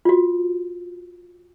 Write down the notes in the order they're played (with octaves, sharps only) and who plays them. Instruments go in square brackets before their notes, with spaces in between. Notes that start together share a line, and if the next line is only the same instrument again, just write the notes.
[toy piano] F4 F#4